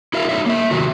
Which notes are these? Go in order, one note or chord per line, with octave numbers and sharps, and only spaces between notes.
E4 F#4 A#4 E5 F5
D#4 C#5 E5
A#3 E5
C3 D#3 F#3 F#4